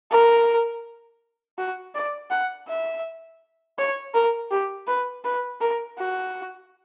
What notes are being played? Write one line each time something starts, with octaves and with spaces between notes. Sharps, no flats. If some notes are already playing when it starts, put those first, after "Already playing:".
A#4
F#4
D5
F#5
E5
C#5
A#4
G4
B4
B4
A#4
F#4